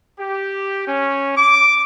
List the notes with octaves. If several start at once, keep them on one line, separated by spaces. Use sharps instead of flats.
G4
C#4
D6